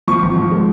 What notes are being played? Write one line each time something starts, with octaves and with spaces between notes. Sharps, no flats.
F3 C#6
G#1
F3
G#3